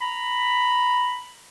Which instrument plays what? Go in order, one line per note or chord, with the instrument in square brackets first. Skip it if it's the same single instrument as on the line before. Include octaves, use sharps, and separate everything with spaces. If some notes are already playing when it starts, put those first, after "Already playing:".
[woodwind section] A#5 B5